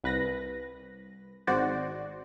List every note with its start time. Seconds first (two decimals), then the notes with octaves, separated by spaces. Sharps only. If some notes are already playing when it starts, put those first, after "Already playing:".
0.04 C2 B4 A#6
1.47 G#1 G#2 F#4 C5 D5